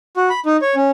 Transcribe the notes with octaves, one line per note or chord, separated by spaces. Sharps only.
F#4
B5
D#4
C#5
C#4